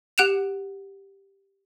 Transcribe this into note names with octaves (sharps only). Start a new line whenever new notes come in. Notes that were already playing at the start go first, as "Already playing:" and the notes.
G4 F#5 F#6 D7 E7 F7